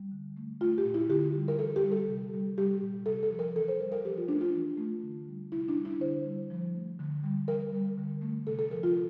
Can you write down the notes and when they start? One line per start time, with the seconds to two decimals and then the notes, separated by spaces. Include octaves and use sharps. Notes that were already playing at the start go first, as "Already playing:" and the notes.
Already playing: G3
0.12 D3
0.37 A3
0.61 A3 F4
0.78 G4
0.85 A#2
0.94 E4
1.10 D3 G4
1.35 G3
1.48 A#4
1.59 E3 A4
1.76 G4
1.84 G3
1.92 A4
2.08 C3
2.33 G3
2.58 G3 G4
2.82 A#2
3.06 C3 A4
3.23 A4
3.31 F3
3.39 A#4
3.56 E3 A4
3.68 C5
3.80 G3 A#4
3.92 A#4
4.04 F3 G4
4.17 F4
4.28 A3 D4
4.41 F4
4.54 E3
4.78 A3
5.03 D3
5.28 G3
5.52 C3 E4
5.68 D4
5.77 G3
5.85 E4
6.00 D3 C5
6.25 G3
6.50 F3
6.74 A3
6.99 D3
7.23 G3
7.48 E3 A#4
7.72 G3
7.98 D3
8.21 A3
8.46 C3 A4
8.59 A4
8.70 F3 A#4
8.83 F4